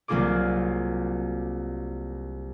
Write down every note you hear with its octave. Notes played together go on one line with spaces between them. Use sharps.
C2 F#3 A#3 F4 G#4 D6